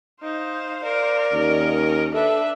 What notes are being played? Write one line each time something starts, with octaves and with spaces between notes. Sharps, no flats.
D#4 C5 F5
A#4 D5
D#2 C#4 D#5
D4 A4 B4 E5